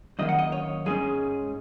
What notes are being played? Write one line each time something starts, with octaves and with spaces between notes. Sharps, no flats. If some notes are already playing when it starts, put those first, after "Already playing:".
F#2 D#3 A#3 D#5
F#5
D#5
C#5
G#2 G#3 C#4 G#4